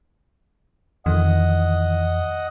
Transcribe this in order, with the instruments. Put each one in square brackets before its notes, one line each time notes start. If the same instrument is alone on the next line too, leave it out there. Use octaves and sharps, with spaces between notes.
[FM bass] F2 [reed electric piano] D#3 E3 [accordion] D#5 F#5 D#6